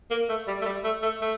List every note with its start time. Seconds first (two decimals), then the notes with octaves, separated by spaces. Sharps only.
0.10 A#3
0.29 A3
0.47 G3
0.62 A3
0.65 G3
0.84 A3
1.02 A3
1.21 A3